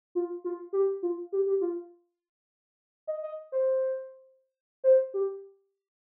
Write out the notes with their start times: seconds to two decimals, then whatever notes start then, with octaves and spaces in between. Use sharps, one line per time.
0.15 F4
0.44 F4
0.73 G4
1.03 F4
1.32 G4
1.46 G4
1.61 F4
3.07 D#5
3.23 D#5
3.52 C5
4.84 C5
5.14 G4